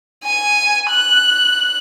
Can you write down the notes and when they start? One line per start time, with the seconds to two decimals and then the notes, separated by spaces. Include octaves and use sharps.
0.24 G#5
0.90 F#6